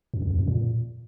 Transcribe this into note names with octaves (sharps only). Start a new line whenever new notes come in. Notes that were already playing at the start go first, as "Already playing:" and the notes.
F#2
F2
E2
F#2
A#2